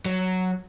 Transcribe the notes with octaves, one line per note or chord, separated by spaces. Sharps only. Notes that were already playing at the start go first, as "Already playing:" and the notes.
F#3